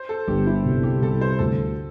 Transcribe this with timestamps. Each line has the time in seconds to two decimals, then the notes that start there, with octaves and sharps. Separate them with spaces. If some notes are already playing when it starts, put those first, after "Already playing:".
Already playing: C5
0.09 A4
0.27 G1 G4
0.46 E4
0.65 C2
0.83 G4
1.02 C2 A4
1.21 C5
1.39 D2 A4